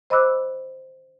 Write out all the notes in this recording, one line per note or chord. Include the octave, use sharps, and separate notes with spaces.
C5 D#5 B5 D6 E6 F#6